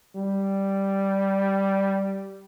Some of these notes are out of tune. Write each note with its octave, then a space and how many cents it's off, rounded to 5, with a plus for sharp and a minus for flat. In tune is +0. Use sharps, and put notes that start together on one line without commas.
G3 -5